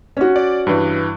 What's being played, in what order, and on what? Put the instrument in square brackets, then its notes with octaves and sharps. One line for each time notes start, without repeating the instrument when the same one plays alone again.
[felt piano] C#4 F#4
[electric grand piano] D5
G2 E3